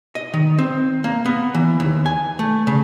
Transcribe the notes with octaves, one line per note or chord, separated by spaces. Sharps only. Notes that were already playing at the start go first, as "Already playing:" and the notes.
D#5
D#3
C4
A#3
B3
E3
D#2
G#5
A3
C#3